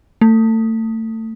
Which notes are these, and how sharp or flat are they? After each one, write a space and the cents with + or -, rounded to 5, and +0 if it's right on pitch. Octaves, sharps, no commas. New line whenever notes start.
A3 +30